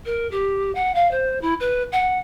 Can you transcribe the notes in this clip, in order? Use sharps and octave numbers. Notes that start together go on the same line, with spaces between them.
A#4
G4
F#5
F5
C5
E4
B4
F#5